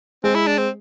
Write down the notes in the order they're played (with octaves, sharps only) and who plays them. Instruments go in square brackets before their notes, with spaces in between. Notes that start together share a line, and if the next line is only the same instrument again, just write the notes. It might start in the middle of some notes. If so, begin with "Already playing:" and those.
[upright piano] G#3 [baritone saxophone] C4
[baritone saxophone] E4
D4
C4